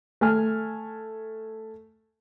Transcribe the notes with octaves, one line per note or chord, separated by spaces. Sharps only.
A3 G#5 F6